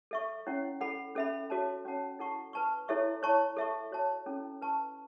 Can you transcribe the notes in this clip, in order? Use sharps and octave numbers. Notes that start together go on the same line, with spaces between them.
A4 E5 C#6
C#4 E4 C#5 F#5
A4 F#5 B5
C#4 A4 E5 B5
F#4 A4 C#5 E5 A5
C#4 F#4 C#5 F#5 A5
E4 A4 F#5 A5 C#6
B4 A5 C#6
E4 A4 C#5 E5 C#6
E4 C#5 A5 C#6
A4 E5 A5 C#6
F#4 C#5 A5
C#4 E4 A4
B4 A5 C#6